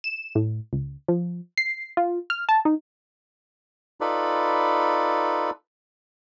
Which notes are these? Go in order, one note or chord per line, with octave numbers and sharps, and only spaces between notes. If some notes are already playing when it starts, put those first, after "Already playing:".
E7
A2
C#2
F3
C7
F4
F6
A5
D#4
D#4 F4 A4 B4 D5 B5